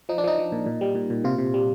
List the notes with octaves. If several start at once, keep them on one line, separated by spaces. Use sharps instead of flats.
F3 D#4
D4
F3 D#4
F3
A#2
A#2
G3
A#2
A#2
C3 F4
C3
G3